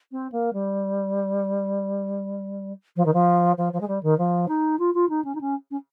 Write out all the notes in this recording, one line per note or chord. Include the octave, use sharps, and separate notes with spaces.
C4
A#3
G3
F3
D#3
F3
F3
F3
G#3
G3
D#3
F3
D#4
F4
F4
D#4
C#4
D#4
C#4
C#4